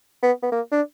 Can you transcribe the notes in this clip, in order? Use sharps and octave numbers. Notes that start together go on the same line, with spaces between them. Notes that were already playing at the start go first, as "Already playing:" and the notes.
B3
B3
A#3
D4